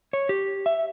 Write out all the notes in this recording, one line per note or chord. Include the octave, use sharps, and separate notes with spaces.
C#5
G4
E5